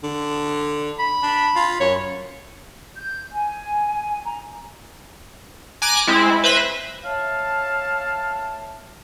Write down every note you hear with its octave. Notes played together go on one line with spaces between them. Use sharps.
D3
B5
D4
F4
F#2 C#5
G6
G#5
A#5
G#5 A#5 D6 F#6 D7
G#3 C4 E4
B4 C5 E5 B5 A#6
C#5 E5 F5 A5